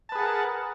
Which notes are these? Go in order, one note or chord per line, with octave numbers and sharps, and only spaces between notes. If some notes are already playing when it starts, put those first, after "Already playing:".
G#4 A#4 B4 F#5 A5